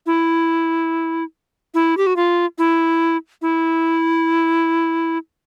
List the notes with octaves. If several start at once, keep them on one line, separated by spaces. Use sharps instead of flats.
E4
E4
G4
F#4
F4
E4
E4